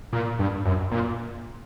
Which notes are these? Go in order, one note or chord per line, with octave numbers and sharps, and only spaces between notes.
A#2
G2
F#2
A#2